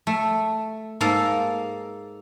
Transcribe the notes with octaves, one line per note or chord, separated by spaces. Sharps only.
A3
G#2 A#3 A4 F5